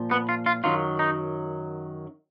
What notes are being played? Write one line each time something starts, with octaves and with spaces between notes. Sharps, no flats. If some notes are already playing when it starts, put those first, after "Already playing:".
Already playing: A#2 F3
B3
F4
F4
F#2 D#3 F#3 F4
D#4